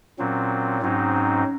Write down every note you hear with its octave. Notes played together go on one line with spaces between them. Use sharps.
A#2 F#3 C4 C#4
G#2 F#3 C4 C#4 D#4